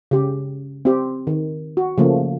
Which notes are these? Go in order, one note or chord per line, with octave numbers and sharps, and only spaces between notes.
C#3 G4
C4 G4
D#3
F#4
C#3 F3 A3 A#3